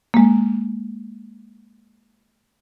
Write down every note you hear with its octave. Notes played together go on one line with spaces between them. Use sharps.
G#3 A#3